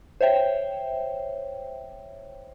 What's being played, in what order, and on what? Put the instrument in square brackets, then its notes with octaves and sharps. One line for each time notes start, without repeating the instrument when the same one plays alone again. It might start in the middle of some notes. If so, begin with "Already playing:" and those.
[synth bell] C5 C#5 E5 G5